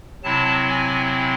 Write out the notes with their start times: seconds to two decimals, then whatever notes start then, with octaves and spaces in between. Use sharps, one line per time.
0.23 C3 F#3 C4 E4 A5
0.69 G#5